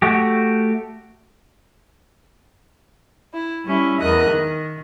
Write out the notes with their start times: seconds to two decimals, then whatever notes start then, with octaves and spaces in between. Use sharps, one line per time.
0.02 A3 F#4 G4
3.33 E4
3.65 G3 C#4 E4
4.00 E2 A#4 D#5 D#6 F#6
4.31 D#3